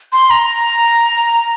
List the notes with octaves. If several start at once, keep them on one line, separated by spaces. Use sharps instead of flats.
C6
A#5